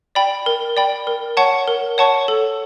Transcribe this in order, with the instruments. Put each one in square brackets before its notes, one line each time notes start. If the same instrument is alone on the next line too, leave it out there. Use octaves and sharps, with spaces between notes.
[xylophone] D5 G5 B5
A#4
D5 G5 B5
A#4
C#5 F#5 A5 C#6
A#4
C#5 F#5 A5 C#6
A4